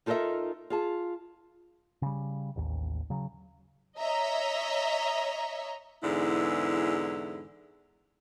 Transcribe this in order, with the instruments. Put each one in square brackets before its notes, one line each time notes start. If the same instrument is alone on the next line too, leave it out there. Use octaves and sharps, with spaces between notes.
[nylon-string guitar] D#4 F4 A4 A#4 D#5 E5
F4 G#4 A5
[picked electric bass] C#3 G3
A1 D#2
C#3 F#3
[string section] C#5 D#5 E5 A#5
[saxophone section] E2 G#2 D3 E4